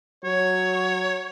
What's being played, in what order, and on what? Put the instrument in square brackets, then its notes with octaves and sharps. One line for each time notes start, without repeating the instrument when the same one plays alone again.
[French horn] F#3 [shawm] C#5